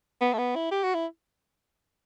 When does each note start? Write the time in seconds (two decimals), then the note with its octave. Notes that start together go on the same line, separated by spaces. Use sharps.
0.21 B3
0.33 A3
0.38 B3
0.55 E4
0.71 G4
0.84 F#4
0.94 E4